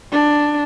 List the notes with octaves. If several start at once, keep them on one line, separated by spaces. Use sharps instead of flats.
D4